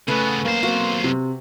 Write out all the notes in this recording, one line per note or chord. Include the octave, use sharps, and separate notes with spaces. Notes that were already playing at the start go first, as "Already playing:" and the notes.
C#3 A3 B3 C#4 B4 G#5
B1 A#3 C5
A#3 C4 F#4
C3